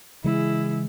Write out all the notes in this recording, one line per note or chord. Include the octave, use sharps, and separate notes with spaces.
C#3 E3 G#3 E4 G#4